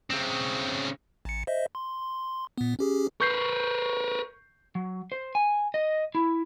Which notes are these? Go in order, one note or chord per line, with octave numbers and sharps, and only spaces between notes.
C#3 C4
A1 C#7
C5 D#5 E5
C6
C6
A#2 B3
C#4 G4 G#4
A#4 B4 C#6 G6 C7
F#3
C5
G#5
D#5
E4